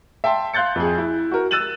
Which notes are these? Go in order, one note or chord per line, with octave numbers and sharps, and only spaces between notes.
E5 G5 A5 C6
F5 C6 F#6 G6 A6 C#7
F2 G#4
E4
F#4 A#4
E6 F#6 A6 D#7 E7 F#7